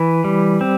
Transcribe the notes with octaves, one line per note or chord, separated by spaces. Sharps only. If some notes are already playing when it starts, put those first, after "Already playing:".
Already playing: E3 B4
G3
C4